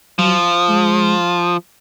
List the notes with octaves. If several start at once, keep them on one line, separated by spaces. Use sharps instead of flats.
F3 F#3
G#3